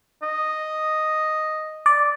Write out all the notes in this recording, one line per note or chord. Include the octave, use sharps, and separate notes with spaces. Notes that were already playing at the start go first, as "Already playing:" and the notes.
D#5
D5